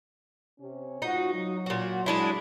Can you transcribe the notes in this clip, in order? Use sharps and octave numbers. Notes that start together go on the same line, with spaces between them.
C3 C#4
G#2 D#4 F4 F#4
F#3
A#2 F#4
G#3 D4 E4